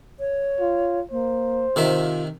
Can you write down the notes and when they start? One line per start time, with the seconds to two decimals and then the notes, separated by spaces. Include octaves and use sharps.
0.20 C#5
0.60 F4
1.11 A#3 C5
1.76 C3 D#3 F4 E5